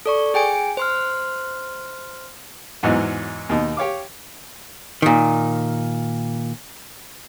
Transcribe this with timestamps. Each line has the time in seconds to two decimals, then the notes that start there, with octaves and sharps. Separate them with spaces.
0.06 A4 D5 C#6
0.34 G#4 G5 G#5 D7
0.77 C5 C6 F6
2.83 E2 G#2 E3 F#3 D#4 D#5
3.49 D#2 B2 D#4
3.77 G4 C#5 F5 D6
5.02 A#2 D#3